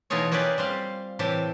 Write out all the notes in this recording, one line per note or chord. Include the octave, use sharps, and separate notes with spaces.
B2 E3 D#4 F4 G#4 C#5
A#3 C#4 G4 G#4 B4 D5
G3 C4 G4 F5
A2 C3 E3 G4 A5